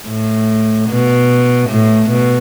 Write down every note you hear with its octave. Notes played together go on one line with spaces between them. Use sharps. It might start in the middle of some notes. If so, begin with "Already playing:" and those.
A2
B2
A2
B2